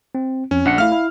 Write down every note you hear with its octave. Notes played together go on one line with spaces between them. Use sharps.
C4
F2 C#4
A#1 D4 F#5 C#7
A3 E4 F5 F6
E4